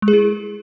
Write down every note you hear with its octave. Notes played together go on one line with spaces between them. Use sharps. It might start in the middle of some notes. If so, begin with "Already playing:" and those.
G#3
G#4
E4